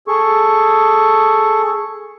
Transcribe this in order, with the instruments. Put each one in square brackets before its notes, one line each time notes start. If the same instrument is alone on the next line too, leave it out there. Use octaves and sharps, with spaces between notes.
[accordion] G#4 A4 C#6